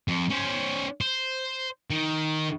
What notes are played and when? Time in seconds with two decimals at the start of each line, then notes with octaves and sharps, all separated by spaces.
0.08 F2
0.30 C#4 C5
1.01 C5
1.90 D#3